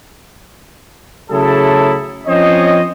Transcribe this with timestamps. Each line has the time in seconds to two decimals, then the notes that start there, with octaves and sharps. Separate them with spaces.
1.31 C#3 F#3 A3 E4 G#4 A4
2.28 F3 C4 C#4 C5 C#5 D#5